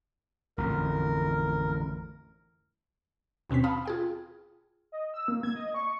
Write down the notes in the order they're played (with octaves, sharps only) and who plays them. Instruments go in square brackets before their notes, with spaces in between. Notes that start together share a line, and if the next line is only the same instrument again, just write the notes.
[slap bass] A1 F2 D3 [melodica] A#4
[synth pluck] D#2 B2 C4 C#4 B6
F5 A5 B5 D#6 F6
F4 G#4 G5
[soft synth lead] D#5
E6
A#3
G#6
D#5
C#6